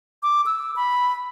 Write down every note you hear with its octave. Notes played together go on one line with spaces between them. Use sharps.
D6
E6
B5